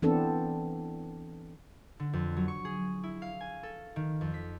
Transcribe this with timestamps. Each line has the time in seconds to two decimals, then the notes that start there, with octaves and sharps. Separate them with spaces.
0.02 E3 B3 C4 D4 A4
2.00 D3
2.13 F2
2.37 F#3
2.48 C#6
2.65 G#4
3.03 E4
3.22 F5
3.41 G#5
3.63 A4
3.96 D#3
4.21 F2
4.34 B6